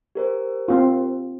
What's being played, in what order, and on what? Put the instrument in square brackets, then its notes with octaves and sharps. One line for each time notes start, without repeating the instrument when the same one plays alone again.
[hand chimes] G4 A#4 C5
[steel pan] C4 F4